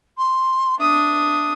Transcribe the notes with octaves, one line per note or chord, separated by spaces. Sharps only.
C6
D4 E5 D#6